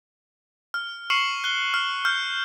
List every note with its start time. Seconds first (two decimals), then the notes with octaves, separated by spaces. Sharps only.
0.74 F6
1.10 C#6 F6 C7 C#7 E7 F#7
1.44 F#6 G7
1.74 F6
2.05 F6 G6